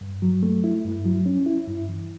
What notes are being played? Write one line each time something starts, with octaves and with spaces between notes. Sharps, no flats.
G2
F#3
A3
E4
G2
F#3
C#4
E4
G2
E3